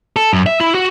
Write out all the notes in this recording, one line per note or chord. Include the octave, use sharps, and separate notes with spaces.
A4
F#2
E5
E4
F#4